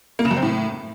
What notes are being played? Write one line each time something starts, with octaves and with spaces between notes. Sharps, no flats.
A#3
C#3
F#2
C4
A2